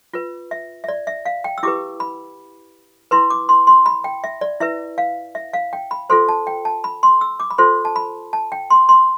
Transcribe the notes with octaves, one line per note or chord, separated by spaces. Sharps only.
F4 B4
E5
E5
D5
E5
F5
G5
E6
E4 G4 B4 D6
B5
E4 B4 C6
D6
C6
C6
B5
G5
E5
D5
E4 B4 E5
F5
E5
F5
G5
B5
F4 A4 C5 C6
A5
G5
A5
B5
C6
E6
D6
B5
F4 A4 C5 C6
A5
B5
A5
G5
C6
C6